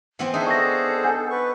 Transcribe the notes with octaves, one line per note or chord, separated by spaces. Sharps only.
E3 B3 C4
D4 D#4 G#4 C5 E5
A4 C#6 A#6
F#5 G#5 G6
B4 C#6